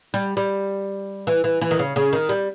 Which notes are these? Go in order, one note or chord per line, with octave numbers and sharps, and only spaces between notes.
G3
G3
E3
E3
E3
D#3
C#3
C#3
D#3
G3